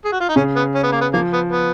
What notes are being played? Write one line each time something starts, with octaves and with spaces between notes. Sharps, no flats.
G#4
F#4
F4
D#4
C#3 C#4
B3
C#4
B3
A#3
B3
F3 A#3
B3
B3